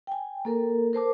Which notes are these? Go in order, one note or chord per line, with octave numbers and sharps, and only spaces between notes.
G5 G#5
A#3 A4 A#4
A#4 C5 A5 D6